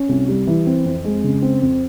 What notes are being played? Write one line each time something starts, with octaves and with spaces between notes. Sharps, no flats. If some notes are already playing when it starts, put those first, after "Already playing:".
Already playing: C#4
C2
G3
E3
C4
F2
G#3
C#3
C4
F2